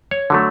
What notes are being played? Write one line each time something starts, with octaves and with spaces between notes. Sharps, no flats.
C#5
D3 F#3 A3